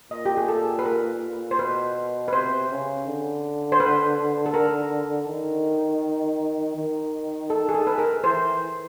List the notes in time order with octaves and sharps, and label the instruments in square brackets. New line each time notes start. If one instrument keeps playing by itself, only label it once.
[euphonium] A#2 [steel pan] D#5
[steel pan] G4
G#4
A4
B4
A#4
C5
[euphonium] B2 [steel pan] B4
[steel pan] B4
[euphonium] C3 [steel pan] C5
[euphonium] C#3
D3
[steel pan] C5
B4
A4
A#4
[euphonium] D#3
D#3
[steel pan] A4
G#4
A4
B4
A#4
[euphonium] E3 [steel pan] C5